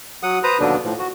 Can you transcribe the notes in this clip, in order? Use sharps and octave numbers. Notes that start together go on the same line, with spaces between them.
F#3 F#5 D#6
B4 C5 A#5 D#6
D#2 B2 D3 F#3 B3 D4
A2 F3
F#4